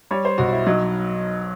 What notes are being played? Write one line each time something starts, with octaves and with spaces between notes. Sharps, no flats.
G3 C#5
C5
B1 F#4
E4
F#3 D#4